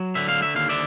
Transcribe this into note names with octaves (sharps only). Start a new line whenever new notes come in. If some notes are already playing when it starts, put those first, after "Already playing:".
Already playing: F#3
D3 E5
F5
E5
D#2 F5
D5 E5